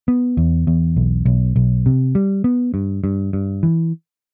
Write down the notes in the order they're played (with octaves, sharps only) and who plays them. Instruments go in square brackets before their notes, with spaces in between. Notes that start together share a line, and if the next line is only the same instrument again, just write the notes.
[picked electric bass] B3
E2
E2
B1
B1
B1
C3
G3
B3
G2
G2
G2
E3